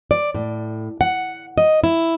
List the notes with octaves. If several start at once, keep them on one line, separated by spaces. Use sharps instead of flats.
D5
A2
F#5
D#5
E4